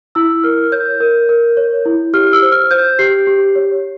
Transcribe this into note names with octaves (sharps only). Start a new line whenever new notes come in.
E4 E6
A#4 F6
C#5 G6
A#4
A#4
C#5
E4
G4 F6
E6
C5
F6
C5 G6
G4 C7
G4
C#5